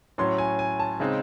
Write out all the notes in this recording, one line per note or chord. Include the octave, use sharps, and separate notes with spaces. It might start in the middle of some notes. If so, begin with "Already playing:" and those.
A2 F#3 C#4 C6
G#5
G#5
A5
C#3 G#3 C4 D#4